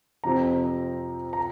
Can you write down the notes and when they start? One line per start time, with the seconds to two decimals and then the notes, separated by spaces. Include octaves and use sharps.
0.24 F2 C3 F3 C4 A#5
1.33 A#5